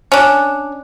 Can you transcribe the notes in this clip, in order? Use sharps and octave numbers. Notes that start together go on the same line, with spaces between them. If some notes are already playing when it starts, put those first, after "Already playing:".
C#4 D4